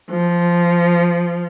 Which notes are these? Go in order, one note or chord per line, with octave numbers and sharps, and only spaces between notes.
F3